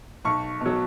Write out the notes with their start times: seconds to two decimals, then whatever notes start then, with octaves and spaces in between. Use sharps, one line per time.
0.25 B1 C#6
0.61 B2 F#3